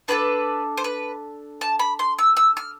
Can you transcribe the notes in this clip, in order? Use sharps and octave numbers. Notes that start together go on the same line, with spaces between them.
D4 F4 A4 B4
C5
B4
A5
B5
C6
E6
E6
F6